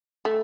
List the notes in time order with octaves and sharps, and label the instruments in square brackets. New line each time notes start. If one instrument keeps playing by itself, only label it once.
[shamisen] A3